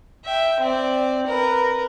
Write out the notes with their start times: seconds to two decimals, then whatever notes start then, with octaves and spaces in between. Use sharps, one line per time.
0.25 E5 G5
0.60 C4 D5
1.27 A#4 B4